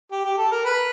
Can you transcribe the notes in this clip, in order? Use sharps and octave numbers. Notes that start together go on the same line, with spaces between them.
G4
G4
A4
A#4
B4